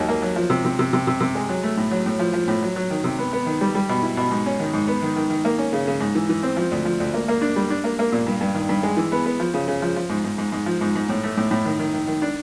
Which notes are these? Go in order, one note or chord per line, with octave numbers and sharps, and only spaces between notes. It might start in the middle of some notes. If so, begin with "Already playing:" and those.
Already playing: D#2 F#3
A#3
F#3
F3
C3
C3
C3
C3
C3
C3
G#3
F#3
A3
A2
F#3
A2
F3
F3
A2
F#3
F#3
D#3
C3
B3
B3
D#3
G3
G3
B2
E4
B2
G#2
C#4
D#3
G#2
B3
D#3
D#3
D#3
A#3
C#4
C#3
C#3
G#2
E3
E3
C4
F3
D2
F3
D2
A#3
A#3
D4
G3
D4
A#3
A#3
A#2
G2
G2
D#3
G2
G#3
E3
B3
B3
F3
C#3
C#3
F3
F3
G#2
G#2
G#2
G#2
F3
G#2
G#2
A2
A3
A2
A2
D#3
D#3
D#3
D#3
D4